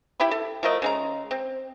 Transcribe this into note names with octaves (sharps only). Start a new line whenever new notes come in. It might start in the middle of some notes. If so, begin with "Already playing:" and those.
E4 G4 E5 B5
A4
F3 A3 A#4 D#5
C#3 G#3 A#5
C4